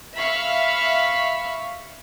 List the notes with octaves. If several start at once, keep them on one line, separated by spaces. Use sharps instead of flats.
E5 F5 B5 C#6